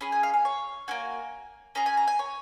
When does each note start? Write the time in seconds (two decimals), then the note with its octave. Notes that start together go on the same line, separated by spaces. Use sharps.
0.01 C#4 G#4 B5
0.12 G#5
0.23 F5
0.33 F5
0.45 C#5
0.88 A#3 C#4 F#4 G#5
1.75 C#4 G#4 A#5
1.86 G#5
1.97 A#5
2.07 G#5
2.19 C#5